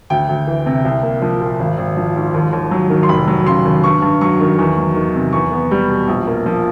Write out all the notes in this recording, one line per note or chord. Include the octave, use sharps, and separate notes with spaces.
D2 G5
D2
E3
C3
C2
A#3
F3
A#2
G#1
G#1
F3
G#2
D#2
D#2
F#3
D#3
C6
F1 B5
F#3
C#3 C6
D#2
G2 C#6
G2
F#3 C#6
D#3
E2
F#3
D#3
C3
E2 C#6
B3
G3
B2
A#1
A#3
F3